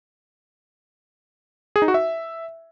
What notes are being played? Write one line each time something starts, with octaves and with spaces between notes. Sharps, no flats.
G#4
D#4
F#4
E5